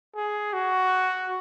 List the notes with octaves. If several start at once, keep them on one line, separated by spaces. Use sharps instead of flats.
G#4
F#4